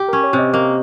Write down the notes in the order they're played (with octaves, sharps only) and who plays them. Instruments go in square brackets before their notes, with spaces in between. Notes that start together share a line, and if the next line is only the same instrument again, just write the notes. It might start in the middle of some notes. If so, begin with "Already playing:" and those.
Already playing: [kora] G4
[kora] C#4 [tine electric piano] A#4
[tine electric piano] C#5
[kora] C3
[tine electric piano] D#5
[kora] A#3 [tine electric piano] D#5